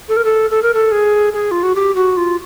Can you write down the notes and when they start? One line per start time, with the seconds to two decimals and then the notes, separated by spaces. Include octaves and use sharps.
0.09 A4
0.16 A#4
0.24 A4
0.50 A4
0.62 A#4
0.74 A4
0.91 G#4
1.33 G#4
1.51 F4
1.63 F#4
1.75 G4
1.95 F#4
2.17 F4